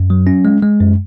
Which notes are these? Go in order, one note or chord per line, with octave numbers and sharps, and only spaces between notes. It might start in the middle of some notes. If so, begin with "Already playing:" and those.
Already playing: F#2
F#3
C#4
G#3
G#3
F#2